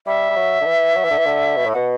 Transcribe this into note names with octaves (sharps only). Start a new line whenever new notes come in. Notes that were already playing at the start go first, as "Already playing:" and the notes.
G3 E5
G3
F#3
D3
E3
F#3
E3
D3
E3
D3
B2
A2
B2 F#5